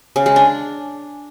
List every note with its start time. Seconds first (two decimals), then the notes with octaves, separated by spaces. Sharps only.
0.16 C#3
0.26 G#3
0.36 D4